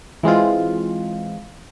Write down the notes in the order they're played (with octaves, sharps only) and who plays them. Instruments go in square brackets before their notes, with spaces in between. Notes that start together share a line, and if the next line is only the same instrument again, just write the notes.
[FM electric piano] E3 G#3 C4 F4